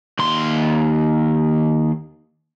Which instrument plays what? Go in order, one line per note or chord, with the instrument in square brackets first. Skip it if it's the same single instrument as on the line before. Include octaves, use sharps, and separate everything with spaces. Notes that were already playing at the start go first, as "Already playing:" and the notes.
[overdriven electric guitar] D#2 C6